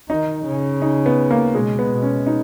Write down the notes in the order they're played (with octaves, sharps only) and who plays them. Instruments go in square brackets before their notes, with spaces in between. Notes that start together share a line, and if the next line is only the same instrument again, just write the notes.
[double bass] D#3 [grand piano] D#4
[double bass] C#3
[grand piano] D#4
B3
A#3
[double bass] B2 [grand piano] G#3
[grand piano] B3
[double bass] B2
[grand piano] C#4
D#4